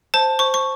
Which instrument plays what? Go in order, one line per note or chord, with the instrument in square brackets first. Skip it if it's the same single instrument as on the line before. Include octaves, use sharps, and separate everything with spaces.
[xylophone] C5 A5
C5 C#6
C#6